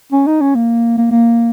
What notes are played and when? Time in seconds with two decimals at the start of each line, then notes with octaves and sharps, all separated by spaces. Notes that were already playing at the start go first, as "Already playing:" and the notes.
0.13 C#4
0.27 D#4
0.41 C#4
0.55 A#3
0.98 A#3
1.11 A#3